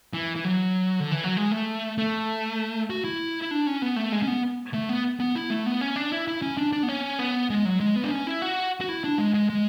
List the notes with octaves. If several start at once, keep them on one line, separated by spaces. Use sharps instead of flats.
E3
E3
F#3
D3
E3
F#3
G#3
A3
A3
F#4
E4
E4
D4
C#4
B3
A3
G#3
C#4
B3
A3
B3
B3
E4
A3
B3
C#4
D4
E4
E4
C#4
D4
D4
B3
C#4
B3
G#3
F#3
G#3
B3
D4
C#4
E4
F#4
F#4
E4
D4
G#3
G#3
G#3